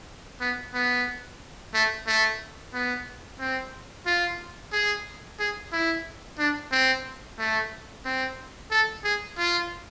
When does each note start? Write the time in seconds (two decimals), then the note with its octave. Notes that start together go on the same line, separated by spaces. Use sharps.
0.41 B3
0.74 B3
1.74 A3
2.07 A3
2.74 B3
3.40 C4
4.07 F4
4.73 G#4
5.39 G#4
5.73 E4
6.39 D4
6.72 C4
7.39 A3
8.05 C4
8.71 A4
9.04 G#4
9.38 F4